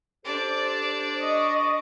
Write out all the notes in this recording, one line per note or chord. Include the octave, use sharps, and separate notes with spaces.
D4 G4 A4 C5 D5
D#5 C#6